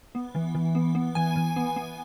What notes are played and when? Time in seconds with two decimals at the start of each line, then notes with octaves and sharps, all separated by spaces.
0.15 B3
0.35 E3
0.55 E3
0.75 B3
0.95 B3
1.15 E3 G#5
1.36 E3
1.56 B3
1.76 B3